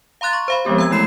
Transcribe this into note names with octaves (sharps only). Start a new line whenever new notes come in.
F5 A#5 C6 F#6 A6
C#6
C5 F5 B5
F3 G#3 B3 C4 G4
A#5 E6 G#6
E3 G#3 A3 E4 C7 E7